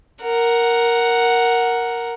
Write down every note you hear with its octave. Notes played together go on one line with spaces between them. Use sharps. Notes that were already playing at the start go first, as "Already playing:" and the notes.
A#4 F#5